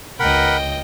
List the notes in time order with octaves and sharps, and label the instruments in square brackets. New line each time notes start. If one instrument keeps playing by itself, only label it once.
[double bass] C#2 [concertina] A#4 F#5 B5 [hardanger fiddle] D#5 G5